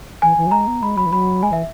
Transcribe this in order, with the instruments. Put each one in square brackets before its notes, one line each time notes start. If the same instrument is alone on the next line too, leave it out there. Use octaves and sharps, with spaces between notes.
[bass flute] E3 [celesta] G#5
[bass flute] E3
F#3
[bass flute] G#3 [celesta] A#5
[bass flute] B3
[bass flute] G#3 [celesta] B5
[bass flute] F#3 [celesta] B5
[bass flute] E3
[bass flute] F#3 [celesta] B5
[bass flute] G#3 [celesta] G#5
[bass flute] E3 [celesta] E5